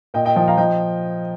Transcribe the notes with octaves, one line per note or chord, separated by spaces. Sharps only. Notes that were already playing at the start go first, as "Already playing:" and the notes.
A#2 D#5 G5
D#5 G5
F3 D#5 G5
F5 A#5
F3 D#5 G5